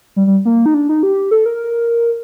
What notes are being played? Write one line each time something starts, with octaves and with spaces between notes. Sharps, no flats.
G3
G3
A#3
D#4
D4
D#4
G4
A4
A#4